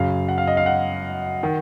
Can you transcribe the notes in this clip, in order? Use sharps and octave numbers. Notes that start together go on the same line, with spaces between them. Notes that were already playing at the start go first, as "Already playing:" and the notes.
Already playing: F#2 C#3 F5
F#5
F5
D#5
F5
F#5
D#3